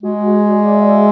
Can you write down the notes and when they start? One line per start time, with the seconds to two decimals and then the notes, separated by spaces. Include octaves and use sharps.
0.03 G#3 F#4
0.26 G#4
0.50 D5
0.74 E5